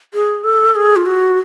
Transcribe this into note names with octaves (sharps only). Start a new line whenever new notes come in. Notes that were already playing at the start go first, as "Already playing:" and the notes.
G#4
A4
G#4
F4
F#4